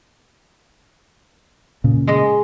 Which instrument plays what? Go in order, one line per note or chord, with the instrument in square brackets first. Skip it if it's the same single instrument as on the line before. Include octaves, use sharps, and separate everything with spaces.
[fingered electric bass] A#2 C#3
[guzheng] G#3 D#5